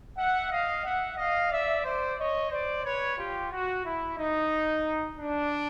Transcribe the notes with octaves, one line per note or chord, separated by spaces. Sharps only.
E5 F#5
D#5 F5
E5 F#5
D#5 F5
D5 E5
C5 D5
C#5 D#5
C5 D5
B4 C#5
F4 G4
F#4
E4
D#4
D4